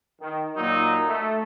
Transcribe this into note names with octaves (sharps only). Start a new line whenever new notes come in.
D#3
A#2 F#3 D#4
A3